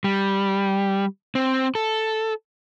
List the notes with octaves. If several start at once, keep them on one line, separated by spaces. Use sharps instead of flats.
G3
C4
A4